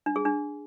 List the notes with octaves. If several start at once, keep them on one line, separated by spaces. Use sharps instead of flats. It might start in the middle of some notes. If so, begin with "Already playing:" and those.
D4
G#4
D4